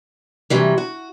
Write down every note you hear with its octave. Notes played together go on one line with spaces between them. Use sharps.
C3 E3 F#3 G3
F#4